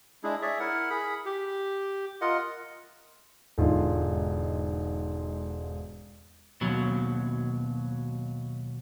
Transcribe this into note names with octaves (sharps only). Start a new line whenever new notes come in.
G#3 D4 E4 G#4
G#4 C#5 D5 E5
E4 A#4 F#5
G#4 B5
G4
F4 A#4 D#5 F#5
E1 G#2 D3 F4
D#2 B2 F#3